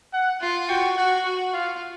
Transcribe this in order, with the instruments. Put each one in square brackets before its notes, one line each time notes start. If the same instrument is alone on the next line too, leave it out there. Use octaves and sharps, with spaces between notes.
[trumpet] F#5
[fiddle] F4
[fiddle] F#4 [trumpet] G5
[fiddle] F#4 [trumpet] F#5
[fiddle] F#4
[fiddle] F4 [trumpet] F5